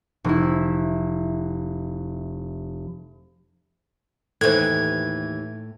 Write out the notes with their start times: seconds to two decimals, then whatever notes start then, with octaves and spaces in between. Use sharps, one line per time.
0.24 F1 E4
4.41 D#2 A2 E3 A4 C5 G#6